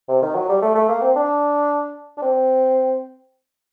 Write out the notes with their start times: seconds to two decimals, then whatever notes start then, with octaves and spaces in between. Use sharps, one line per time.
0.09 C3
0.22 D#3
0.35 F#3
0.49 G3
0.62 A3
0.75 A3
0.89 A#3
1.02 C4
1.16 D4
2.18 D4
2.22 C4